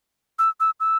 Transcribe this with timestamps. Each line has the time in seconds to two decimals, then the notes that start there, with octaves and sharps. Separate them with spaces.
0.39 E6
0.60 E6
0.80 E6